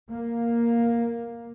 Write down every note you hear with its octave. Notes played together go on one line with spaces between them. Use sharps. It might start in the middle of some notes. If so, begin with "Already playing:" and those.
A#3